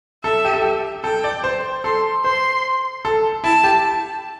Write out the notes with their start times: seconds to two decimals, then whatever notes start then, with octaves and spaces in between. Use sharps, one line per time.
0.24 A4 E5
0.45 G4
0.53 A4
0.62 G4
1.04 A4 G5
1.24 D5
1.44 C5
1.84 A4 C6
2.24 C5 C6
3.05 A4
3.44 E4 A5
3.64 G4